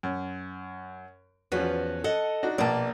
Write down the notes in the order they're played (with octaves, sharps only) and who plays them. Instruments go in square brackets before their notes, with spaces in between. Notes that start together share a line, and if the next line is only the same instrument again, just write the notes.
[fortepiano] F#2
[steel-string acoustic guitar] E2 B4 [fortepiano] F3 C#4 F#4
[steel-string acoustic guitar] A4 D#5 F#5
[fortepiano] D4 D#4 F#4
[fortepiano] A#1 A#3 A5 [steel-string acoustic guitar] B2 D5